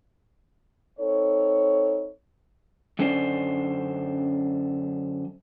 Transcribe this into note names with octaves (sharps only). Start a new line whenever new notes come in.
C4 D#4 A4 C#5
F#2 D3 C#4 D4 C5